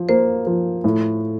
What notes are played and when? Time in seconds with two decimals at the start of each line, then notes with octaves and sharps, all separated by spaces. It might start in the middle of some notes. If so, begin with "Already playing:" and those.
Already playing: F3
0.09 A#3 C5
0.47 F3
0.84 A2